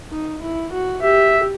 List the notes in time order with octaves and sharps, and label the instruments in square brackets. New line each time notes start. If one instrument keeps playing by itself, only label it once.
[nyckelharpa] D#4
E4
F#4
[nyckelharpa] G4 [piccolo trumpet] E5